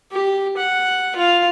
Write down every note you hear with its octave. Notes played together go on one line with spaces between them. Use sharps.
G4
F#5
F4 F5